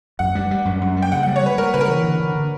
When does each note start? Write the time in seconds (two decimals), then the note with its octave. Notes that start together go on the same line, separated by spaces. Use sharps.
0.19 F#2 F#5
0.35 G3
0.51 G3
0.65 F#2
0.81 F#2
0.96 G3
1.03 G5
1.12 C#3 F#5
1.23 G3 F#5
1.36 C#5
1.43 G3 B4
1.58 G3 A#4
1.74 C#3 B4
1.81 A#4
1.89 E3
2.04 D3
2.20 D3
2.35 D3